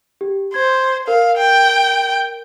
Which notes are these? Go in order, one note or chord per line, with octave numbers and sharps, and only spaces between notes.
G4
C5 G#6
A#4 F5
G5